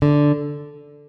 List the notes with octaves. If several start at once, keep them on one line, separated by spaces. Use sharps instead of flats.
D3